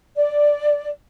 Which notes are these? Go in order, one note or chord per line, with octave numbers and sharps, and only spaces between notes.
D5